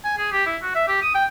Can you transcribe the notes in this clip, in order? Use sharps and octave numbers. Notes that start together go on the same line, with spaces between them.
G#5
G#4
G4
E4
F#4
E5
G4
D#6
G5